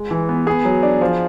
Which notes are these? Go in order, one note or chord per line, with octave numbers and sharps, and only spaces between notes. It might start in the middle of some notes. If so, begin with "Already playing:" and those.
Already playing: G#3
E3
B3
B3 G#4
F#3
D4
F3